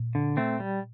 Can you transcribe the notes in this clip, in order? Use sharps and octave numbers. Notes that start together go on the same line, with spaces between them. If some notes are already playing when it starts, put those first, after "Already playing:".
Already playing: A#2
D3
A3 C4
G3